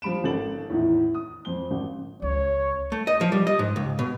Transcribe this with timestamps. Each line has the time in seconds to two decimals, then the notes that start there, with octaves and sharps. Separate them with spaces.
0.02 F3 G3 B5 D7 E7
0.24 G#1 C#4 D#4 A4 A6 F#7
0.70 E2 A2 D#3 E3 D#4 E4
1.14 D#6
1.45 F2 C5 G7
1.71 G#1
2.22 C#2 C#5
2.92 A3
3.07 D#5
3.21 F3
3.32 G3
3.47 D#5
3.59 G#2
3.76 C#2
3.99 B2